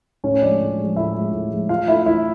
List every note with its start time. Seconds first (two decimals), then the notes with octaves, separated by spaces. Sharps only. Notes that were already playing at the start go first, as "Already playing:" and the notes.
0.24 A2 C#4 C#5
0.34 C#5
0.42 F3 G#3 D4 D5
0.60 A2
0.78 G#3
0.83 F3
0.96 A2 E4 E5
1.16 F3 G#3
1.33 A2
1.52 F3 G#3
1.69 E3 F4 F5
1.88 A3 D4 E4 E5
2.06 E3 E4 E5